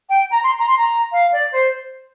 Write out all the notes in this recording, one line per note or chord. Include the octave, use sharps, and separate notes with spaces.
G5
A#5
C6
A#5
C6
A#5
F5
D5
C5